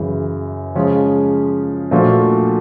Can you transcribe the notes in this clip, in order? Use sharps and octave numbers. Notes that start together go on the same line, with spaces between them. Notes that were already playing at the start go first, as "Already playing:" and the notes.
Already playing: F#2 C#3 E3
C#3 F3 G#3 C#4
A#2 F3 A3 D4 F#4